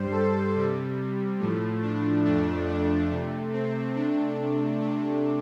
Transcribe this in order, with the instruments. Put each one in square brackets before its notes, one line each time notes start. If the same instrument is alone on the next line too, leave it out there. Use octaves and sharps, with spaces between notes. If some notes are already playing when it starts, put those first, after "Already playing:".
Already playing: [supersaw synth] G2 G3 C5
A4
C3 G3
A2 F3 A3
D4
F2 F3 A3 D4
D4
C3 A3
C4
C3 A3 D4
C3 A3 D4